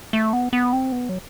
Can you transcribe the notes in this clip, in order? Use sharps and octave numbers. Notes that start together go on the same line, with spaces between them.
A3
B3
B3
C4
B3
F#3